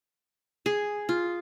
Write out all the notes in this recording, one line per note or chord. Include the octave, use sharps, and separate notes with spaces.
G#4
F4